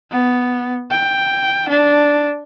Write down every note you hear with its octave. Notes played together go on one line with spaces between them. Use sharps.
B3
G5
D4